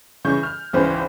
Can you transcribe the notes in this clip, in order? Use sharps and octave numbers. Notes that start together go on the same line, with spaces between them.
C#3 E3 C#4 C#6 G6
F6
G#1 C#2 E3 C#4 B4 C5